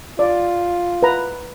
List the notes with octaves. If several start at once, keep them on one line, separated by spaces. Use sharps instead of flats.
F4 D5
B4 A#5